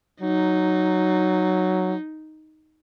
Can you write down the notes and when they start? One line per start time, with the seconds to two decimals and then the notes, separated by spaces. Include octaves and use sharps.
0.22 F#3 D#4